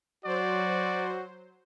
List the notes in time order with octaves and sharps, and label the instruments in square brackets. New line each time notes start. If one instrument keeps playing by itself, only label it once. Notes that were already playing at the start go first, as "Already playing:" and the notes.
[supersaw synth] F#3 C5 [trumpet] F#4 [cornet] D5